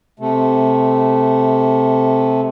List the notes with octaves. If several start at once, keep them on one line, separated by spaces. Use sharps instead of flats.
C3 A3